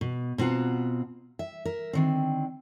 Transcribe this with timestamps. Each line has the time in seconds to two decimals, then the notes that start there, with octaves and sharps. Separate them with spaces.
0.01 B2
0.38 B2 C4 F4 F#5 A#5
1.39 E5
1.65 A#4 E5
1.93 D3 D#3 C4